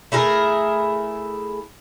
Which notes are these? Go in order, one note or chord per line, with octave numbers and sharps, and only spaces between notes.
A3 E4 G#4 A#4